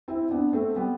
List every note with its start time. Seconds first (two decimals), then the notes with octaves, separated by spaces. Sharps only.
0.08 C4 E4
0.30 B3 D4
0.53 A3 C4
0.76 G3 B3